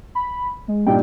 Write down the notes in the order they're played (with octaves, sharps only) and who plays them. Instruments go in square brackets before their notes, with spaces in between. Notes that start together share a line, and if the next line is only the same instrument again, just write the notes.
[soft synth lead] B5
G#3
[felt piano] G2 A#2 D#4 [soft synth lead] G5